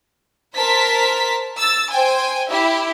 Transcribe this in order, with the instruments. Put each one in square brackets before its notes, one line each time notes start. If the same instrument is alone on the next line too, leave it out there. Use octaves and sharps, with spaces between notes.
[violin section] A#4 C5 A5 B6
E6 A6
C5 G5 G#5
E4 G4 E5